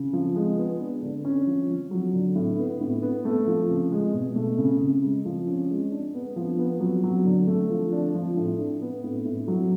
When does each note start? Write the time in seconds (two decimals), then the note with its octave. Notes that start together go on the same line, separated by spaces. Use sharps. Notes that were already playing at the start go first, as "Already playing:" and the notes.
Already playing: C#3
0.13 F3
0.36 G#3
0.57 B3
0.80 D4
1.02 D3
1.25 C#4
1.47 F3
1.69 F3
1.91 F#3
2.13 D3
2.35 A2
2.58 B3
2.81 A2
3.02 B3
3.25 A3
3.47 F3
3.70 C#3
3.92 G#3
4.14 B2
4.36 A3
4.58 C#3
4.80 C#3
5.03 G#3
5.25 F3
5.47 C#4
5.69 G#3
5.91 D4
6.14 B3
6.36 F3
6.59 B3
6.80 F#3
7.04 F#3
7.25 D3
7.47 A3
7.70 F3
7.92 D4
8.14 F3
8.37 A2
8.59 D4
8.81 B3
9.04 A2
9.25 A2
9.48 F#3